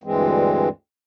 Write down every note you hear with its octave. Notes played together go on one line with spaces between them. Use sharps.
D2 G2 E3 G#3 C4